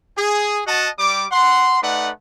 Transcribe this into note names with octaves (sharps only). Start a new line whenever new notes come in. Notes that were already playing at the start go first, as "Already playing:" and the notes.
G#4
F#4 D#5 F#5 A5
G3 D6
F#5 C6
A3 D#4 B4 D5 F#5